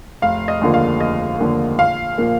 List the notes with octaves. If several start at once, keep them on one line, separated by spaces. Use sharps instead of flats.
F1 F5
D#5
D#2 D3 F3 A#3
F5
F1 D#5
D#2 D3 F3 A#3
A#1 F5
A#2 F3 A#3